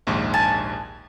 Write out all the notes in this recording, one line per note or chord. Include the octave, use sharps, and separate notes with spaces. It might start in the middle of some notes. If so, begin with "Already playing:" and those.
A#1 D#2 G#2
G#5 A5